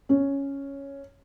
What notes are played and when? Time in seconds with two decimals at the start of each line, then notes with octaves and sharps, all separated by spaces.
0.09 C#4